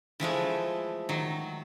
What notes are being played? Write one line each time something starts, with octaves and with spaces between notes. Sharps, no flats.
E3 F3 G#3 A3
D#3 F#3